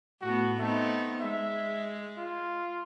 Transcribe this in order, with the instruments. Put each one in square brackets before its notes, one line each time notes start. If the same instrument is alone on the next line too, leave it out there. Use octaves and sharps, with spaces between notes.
[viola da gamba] A2 B3 [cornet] F#4
[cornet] A3 [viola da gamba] B3 C4 D#4
[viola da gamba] G#3 [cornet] E5
[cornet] F4